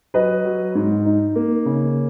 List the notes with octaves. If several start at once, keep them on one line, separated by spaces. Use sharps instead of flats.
F#3 B4 D#5
F#3
G#2
D#4
A#3
C#3